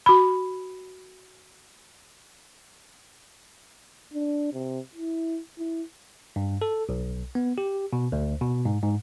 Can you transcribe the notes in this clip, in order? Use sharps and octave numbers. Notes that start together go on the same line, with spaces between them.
F#4 B5
D4
C3
E4
E4
G2
A4
B1
B3
G4
B2
D2
B2
G#2
G#2